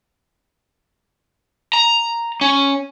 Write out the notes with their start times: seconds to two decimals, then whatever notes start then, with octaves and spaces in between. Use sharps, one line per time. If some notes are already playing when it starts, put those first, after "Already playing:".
1.73 A#5
2.41 C#4